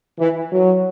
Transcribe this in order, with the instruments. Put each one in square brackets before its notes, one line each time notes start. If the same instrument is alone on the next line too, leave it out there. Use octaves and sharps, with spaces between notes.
[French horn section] E3
F#3